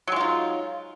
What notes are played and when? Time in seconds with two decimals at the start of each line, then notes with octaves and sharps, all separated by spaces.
0.08 F#3
0.12 G#3
0.16 F4
0.21 D#4